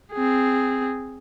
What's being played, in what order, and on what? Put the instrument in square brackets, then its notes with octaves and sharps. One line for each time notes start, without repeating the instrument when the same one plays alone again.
[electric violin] C4 G#4